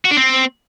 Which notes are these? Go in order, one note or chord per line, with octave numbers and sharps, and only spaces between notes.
F#4
D4
C4